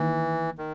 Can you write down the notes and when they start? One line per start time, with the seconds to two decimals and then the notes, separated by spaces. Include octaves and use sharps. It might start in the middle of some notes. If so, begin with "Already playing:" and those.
Already playing: D#3 E3 A#3 D#4
0.58 D#3